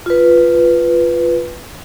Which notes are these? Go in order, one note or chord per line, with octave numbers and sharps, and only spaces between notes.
F4 B4